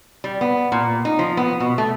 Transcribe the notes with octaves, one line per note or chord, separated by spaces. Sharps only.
G3
B3
A#2
D#4
F3
B3
B2
A3